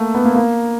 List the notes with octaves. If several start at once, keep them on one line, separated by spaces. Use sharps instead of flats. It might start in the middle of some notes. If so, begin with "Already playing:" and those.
Already playing: A3 A#3
B3
A#3
A#3